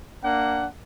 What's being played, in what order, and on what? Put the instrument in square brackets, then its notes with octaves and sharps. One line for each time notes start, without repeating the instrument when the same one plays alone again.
[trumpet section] A#3 D4 F#5